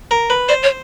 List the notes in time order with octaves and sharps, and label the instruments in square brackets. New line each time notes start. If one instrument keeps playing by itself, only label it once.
[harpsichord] A#4
B4
[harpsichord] C5 [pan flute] D5
[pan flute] C#5